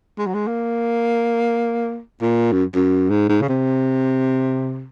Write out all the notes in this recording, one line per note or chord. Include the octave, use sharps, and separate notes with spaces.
G#3
F#3
G#3
A#3
A#2
F#2
F#2
G#2
G#2
C#3
C3